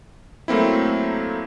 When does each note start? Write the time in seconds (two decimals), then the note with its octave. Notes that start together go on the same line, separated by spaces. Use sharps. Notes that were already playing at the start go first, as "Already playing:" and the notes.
0.48 F#3 A3 A#3 C4 E4